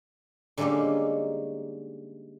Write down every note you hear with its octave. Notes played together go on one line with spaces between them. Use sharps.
D3 G3 G#3 A#3 C#4 D#4